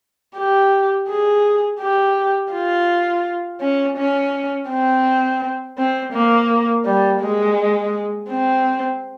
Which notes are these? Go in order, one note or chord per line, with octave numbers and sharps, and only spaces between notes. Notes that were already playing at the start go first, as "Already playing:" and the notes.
G4
G#4
G4
F4
C#4
C#4
C4
C4
A#3
G3
G#3
C4